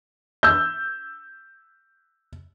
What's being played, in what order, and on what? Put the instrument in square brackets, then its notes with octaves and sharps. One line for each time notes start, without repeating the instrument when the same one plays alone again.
[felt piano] E6 G6